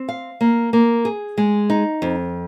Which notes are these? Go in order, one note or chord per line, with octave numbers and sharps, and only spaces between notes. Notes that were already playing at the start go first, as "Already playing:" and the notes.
Already playing: C4
F5
A#3
A#3
G#4
G#3
D#4
F2